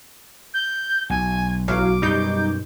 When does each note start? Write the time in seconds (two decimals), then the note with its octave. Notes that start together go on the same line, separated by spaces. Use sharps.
0.54 G6
1.10 B1 G#5
1.68 A1 F#3 F5 D6
2.02 F#2 B2 G3 D#4 G6